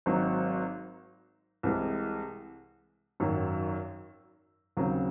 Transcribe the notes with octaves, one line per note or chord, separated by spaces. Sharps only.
G#1 G#2 F#3 C4 D#4
C2 C3 E3 G#3
G#1 F#2 D#3 F#3
D#2 C#3 F#3 C4